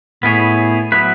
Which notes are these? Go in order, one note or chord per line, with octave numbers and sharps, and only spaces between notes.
A2 B3 E4 G#4 C#5
F#3 B3 E4 B4